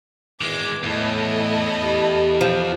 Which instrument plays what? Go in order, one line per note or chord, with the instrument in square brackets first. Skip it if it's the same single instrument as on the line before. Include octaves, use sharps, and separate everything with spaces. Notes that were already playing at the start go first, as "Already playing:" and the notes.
[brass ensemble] E2 [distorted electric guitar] D#3 G#3 [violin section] D6
[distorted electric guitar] E2 [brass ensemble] A2 [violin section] E4 A4 D#5
[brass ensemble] G4
[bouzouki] F3